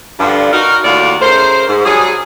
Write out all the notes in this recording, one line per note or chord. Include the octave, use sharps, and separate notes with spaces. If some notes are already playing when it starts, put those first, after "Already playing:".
G2 D3 F3
D#4 F#4 A#4
D#2 A2 A3 F#4 D5 F5
C#3 A3 A#4 C5
G#2
F#3 G3 D4 G#4